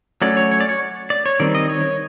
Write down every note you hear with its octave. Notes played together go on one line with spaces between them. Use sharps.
F#3 A3 C#4 D5
C#5
C#5
D5
C#5
D5
C#5
D#3 G3 C4 D5
D#5
C#5